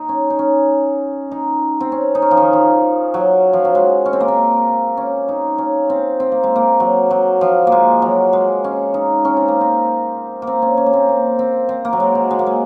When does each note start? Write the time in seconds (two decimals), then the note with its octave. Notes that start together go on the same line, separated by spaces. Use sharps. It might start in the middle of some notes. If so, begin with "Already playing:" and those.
Already playing: D#4
0.09 C#4
0.30 D#4
0.39 C#4
1.32 D#4
1.80 C4
1.92 C#4
2.15 D#4
2.22 C#4
2.31 F3
2.37 D#3
2.53 F3
3.14 F#3
3.53 F3
3.65 F#3
3.75 G#3
4.05 C#4
4.13 C4
4.20 A#3
4.28 C4
4.97 C#4
5.29 D#4
5.58 C#4
5.90 C4
6.20 C4
6.32 A#3
6.43 G#3
6.55 A#3
6.80 F#3
7.10 F#3
7.41 F3
7.67 A#3
7.72 G#3
8.02 F#3
8.33 G#3
8.64 C#4
8.94 D#4
9.25 C#4
9.37 C4
9.48 A#3
9.61 C4
10.42 A#3
10.47 C4
10.62 C#4
10.77 C#4
10.86 A#3
10.93 C4
11.08 A#3
11.39 C4
11.69 C4
11.85 A#3
11.93 F#3
12.00 G#3
12.15 F#3
12.31 G#3
12.39 A#3
12.46 G#3